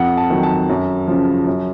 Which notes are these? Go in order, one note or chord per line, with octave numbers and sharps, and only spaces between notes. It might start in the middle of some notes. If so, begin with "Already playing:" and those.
Already playing: F2 F#5
A5
D#3 F#3
A5
F#2
C#3 F3
F#2